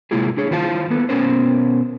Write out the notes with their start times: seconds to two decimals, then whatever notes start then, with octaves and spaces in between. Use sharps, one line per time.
0.11 C3 G#3 A#3 E4 F4 G#4
0.37 D4 G#4 C#5
0.51 D#3 E4 F4 C5 F5 A5
0.90 A#3 B3 A4 B4
1.09 B2 F#3 B3 C#4 A#4 C5